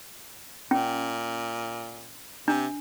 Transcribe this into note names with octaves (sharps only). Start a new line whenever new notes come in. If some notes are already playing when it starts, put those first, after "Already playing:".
A#2 C#4
C3 D4